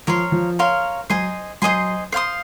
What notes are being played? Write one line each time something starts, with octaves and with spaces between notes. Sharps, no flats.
F3 A#4 C#5 F5 C6
F3
A#4 C#5 F5 C6
F#3 C5 D#5 G#5 C6
F#3 C5 D#5 G#5 C6
C5 F5 C6 D#6